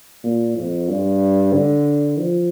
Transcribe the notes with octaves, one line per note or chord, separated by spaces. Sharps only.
A#2
F2
G2
D3
F3